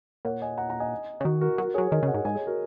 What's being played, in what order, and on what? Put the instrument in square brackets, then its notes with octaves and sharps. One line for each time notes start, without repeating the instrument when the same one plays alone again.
[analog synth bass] A#2 [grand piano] C#5 F#5
[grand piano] D#5 G#5
F#5 A#5
F#5 A#5
D#5 G#5
[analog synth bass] C#3
[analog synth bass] D#3 [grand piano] F#4
[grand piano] F#4 A#4
[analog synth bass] F#3 [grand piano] F#4 A#4
[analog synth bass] F#3 [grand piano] G#4 C#5
[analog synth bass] D#3 [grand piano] A#4 D#5
[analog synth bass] C#3
[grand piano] C#5 F#5
[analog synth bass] G#2
[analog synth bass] G#2 [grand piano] D#5 G#5
[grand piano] G#4 C#5
F#4 A#4